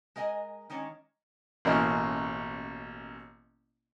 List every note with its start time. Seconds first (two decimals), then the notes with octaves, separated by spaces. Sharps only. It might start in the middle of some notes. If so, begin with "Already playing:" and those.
0.16 G#3 A#4 D#5 F5 G#5
0.70 D#3 G#3 C#4 D4 C#5
1.65 A1 B2 A#3 C#4 A#4 D#5